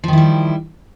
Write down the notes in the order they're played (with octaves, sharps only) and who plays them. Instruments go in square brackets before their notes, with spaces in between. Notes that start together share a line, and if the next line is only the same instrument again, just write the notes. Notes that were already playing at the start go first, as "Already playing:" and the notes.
[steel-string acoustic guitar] F3
D#3
E4
G3